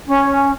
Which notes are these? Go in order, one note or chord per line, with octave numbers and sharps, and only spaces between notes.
C#4